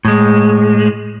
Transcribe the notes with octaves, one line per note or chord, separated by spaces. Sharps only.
A2 G#3